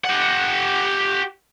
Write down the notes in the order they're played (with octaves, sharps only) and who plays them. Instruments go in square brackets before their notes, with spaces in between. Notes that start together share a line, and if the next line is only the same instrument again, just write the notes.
[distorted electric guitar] G4 F#5